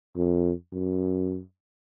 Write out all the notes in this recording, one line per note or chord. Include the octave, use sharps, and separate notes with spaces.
F2
F#2